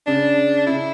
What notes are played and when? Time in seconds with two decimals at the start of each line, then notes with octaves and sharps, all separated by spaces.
0.07 C#3 D4
0.67 C#3 E4